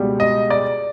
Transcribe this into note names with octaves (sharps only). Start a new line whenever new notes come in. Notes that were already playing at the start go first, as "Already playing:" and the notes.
Already playing: C#2 B2 G3
D#5
D5